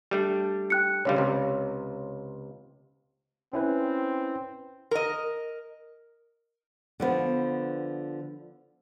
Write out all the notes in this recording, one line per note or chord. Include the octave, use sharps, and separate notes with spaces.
G3 A3 D4
G5 F#6 C#7
C#2 D3 G3 C#5 F5
C#2 C3
C4 C#4 E4 B4
A#4 D#5
D3 F3 B3